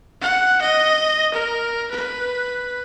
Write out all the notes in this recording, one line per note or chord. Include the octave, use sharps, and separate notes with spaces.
F#5
D#5
A#4
B4